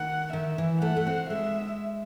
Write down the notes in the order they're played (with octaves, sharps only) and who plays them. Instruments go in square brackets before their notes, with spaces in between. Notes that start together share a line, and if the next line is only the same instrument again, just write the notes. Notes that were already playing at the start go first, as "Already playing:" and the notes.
Already playing: [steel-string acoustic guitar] D#3 [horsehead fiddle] F#5
[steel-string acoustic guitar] D#3 [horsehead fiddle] E5
[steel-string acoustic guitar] E3
[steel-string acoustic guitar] A3 [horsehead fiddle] F#5
[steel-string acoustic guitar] A3
C4
[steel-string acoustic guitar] G#3 [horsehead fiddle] E5